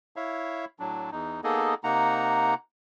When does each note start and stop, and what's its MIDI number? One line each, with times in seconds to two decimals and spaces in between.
0.16 0.65 64
0.16 0.65 73
0.16 0.65 76
0.16 0.65 77
0.79 1.10 45
0.79 1.10 54
0.79 1.10 62
1.12 1.41 40
1.12 1.41 63
1.44 1.74 58
1.44 1.74 59
1.44 1.74 63
1.44 1.74 68
1.44 1.74 69
1.44 1.74 75
1.84 2.54 48
1.84 2.54 58
1.84 2.54 63
1.84 2.54 78
1.84 2.54 82